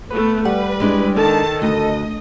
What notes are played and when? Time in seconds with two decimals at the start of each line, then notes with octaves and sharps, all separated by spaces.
0.10 A3 B3 B4
0.45 G3 B4 F#5
0.80 G#3 D4 E4
1.18 D#3 A4 A5
1.62 D2 D#5